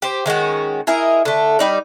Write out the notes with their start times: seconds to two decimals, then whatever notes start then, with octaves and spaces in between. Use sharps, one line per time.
0.02 G4 C5
0.26 D#3 G#3 C#4 F#4
0.87 E4 G#4 A#4 D#5
1.25 D3 A3
1.59 G3 D#4 D5